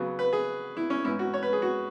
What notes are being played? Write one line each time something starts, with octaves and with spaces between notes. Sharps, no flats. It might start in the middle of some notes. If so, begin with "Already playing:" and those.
Already playing: C#3 F#3 B3
B4
G#4
E4
C#4
G#2 E3 C#4 E4
F#4
C#5
B4
G#4
F#4